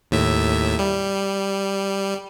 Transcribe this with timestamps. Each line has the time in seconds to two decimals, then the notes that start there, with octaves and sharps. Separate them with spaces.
0.11 D#2 A2 E5
0.79 G3